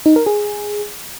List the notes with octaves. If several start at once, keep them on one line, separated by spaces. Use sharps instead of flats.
D#4
A#4
G#4